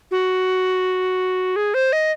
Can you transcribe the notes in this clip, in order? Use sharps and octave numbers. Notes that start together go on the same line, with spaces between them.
F#4
G#4
C5
D#5